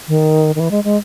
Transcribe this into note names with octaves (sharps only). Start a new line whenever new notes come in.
D#3
D#3
E3
G#3
G#3